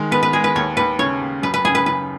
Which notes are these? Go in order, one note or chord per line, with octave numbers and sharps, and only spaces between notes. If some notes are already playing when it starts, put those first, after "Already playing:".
Already playing: D#3 G#3
B3 B4
B4
G#3 G#4
B4
D#2 C#5
D#2 B4
C#3 C#5
D#2
F#2 B4
B4
C#3 G#4
B4
C#3 B4